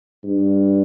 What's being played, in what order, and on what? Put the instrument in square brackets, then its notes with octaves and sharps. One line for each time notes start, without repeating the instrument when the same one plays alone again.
[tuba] G2